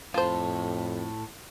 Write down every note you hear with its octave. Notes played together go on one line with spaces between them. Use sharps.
F2 A2 F4 C5 A5